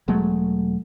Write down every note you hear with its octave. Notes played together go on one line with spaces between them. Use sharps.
E1 F#3 G#3 A3